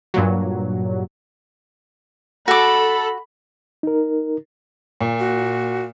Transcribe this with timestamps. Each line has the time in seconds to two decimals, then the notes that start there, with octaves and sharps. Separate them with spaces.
0.14 G2 A#2 F#3
2.48 F#4 A4 B5 D6
3.83 D#4 A#4
5.01 A#2
5.19 F#4